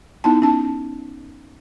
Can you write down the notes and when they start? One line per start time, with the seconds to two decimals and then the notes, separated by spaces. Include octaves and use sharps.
0.24 B3 D#4 E4 A5
0.42 C#4 A5